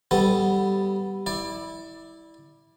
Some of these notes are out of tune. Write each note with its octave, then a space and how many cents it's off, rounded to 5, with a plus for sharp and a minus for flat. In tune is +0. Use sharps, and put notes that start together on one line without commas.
G3 -10 B3 +0 A4 +0
E4 -15 D5 +15